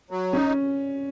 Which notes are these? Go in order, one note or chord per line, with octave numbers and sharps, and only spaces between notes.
F#3
C#4 D#4